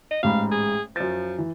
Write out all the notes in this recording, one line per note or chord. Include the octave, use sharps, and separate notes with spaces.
D#5
A1 G#2 F5 B5
G#4
F#2 F3 A6
E3